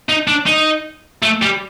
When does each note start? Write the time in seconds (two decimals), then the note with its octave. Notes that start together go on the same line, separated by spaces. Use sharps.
0.09 D#4
0.27 D4
0.46 D#4
1.23 A3
1.42 G3